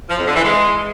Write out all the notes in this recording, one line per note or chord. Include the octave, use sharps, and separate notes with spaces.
F3
F2
D3
E3
G#3